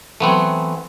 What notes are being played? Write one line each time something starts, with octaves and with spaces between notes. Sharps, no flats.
E3 F#3 A3 B3 C4